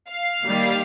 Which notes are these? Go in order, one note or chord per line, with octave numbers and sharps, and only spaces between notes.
F5
D#3 G3 A#3